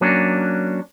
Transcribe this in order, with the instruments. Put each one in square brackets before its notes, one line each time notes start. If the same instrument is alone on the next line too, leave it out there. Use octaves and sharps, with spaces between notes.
[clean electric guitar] F#3 A#3 C#4 D4